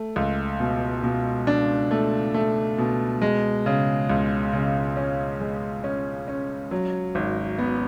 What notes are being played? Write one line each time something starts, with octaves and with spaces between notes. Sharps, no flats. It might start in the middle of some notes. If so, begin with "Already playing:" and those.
Already playing: A3
C#2
B2
B2
D4
A3
A3
B2
G#3
C#3
C#2
C#3
C#4
G#3
C#4
C#4
F#3
G#1
B3